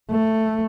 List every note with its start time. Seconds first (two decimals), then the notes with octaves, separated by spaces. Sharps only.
0.11 A3